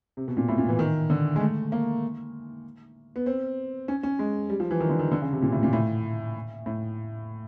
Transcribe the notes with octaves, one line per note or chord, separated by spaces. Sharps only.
C3
B2
A#2
A2
A#2
E3
D#3
D3
G#3
A3
A#3
B3
C4
C#4
C#4
G#3
G3
F3
E3
D#3
D3
D#3
D3
C#3
C3
A#2
A2
A#2
A2
A2